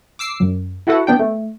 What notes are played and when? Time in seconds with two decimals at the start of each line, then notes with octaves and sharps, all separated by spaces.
0.19 D6 E6 C7
0.40 F#2
0.87 E4 F#4 A4 B4 F#5
1.07 B3 D4 G5
1.19 A3